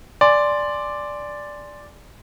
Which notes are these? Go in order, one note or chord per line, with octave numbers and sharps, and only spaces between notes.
D5 G#5 C6